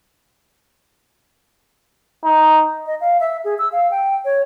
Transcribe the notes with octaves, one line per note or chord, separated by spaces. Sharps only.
D#4
D#5
F5
E5
G#4
E6
F5
G5
C#5